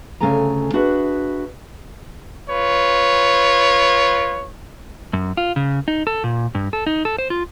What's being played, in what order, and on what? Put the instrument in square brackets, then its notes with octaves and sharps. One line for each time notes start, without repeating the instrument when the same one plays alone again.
[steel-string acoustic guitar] D2 C#3 A3 A4 G#5 A#5
D4 F#4 G#4 B4 E5
[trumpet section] F4 B4 C#5
[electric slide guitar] F#2
F4
C#3
D#4
A4
A#2
G2
A4
D#4
A4
C5
F4